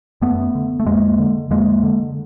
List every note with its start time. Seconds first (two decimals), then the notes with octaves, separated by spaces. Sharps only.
0.22 F#2 A3 B3
0.55 D3
0.80 A3
0.86 F2 G#3 A#3
1.19 D3
1.50 F2 G#3 A#3
1.83 D3